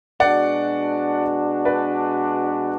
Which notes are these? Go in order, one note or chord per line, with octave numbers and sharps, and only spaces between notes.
B2 G#3 D4 F#4 D5 F#5
B4 D5